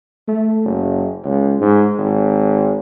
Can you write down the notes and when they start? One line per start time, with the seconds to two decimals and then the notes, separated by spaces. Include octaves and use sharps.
0.28 A3
0.65 F#1
1.25 C#2
1.61 G#2
1.98 G#1